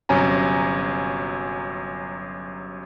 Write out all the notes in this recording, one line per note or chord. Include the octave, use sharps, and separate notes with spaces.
G1 C3 F#3 C#4 G#5 A#5